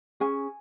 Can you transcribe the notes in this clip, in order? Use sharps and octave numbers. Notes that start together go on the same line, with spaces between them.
C#4 G#4 G#5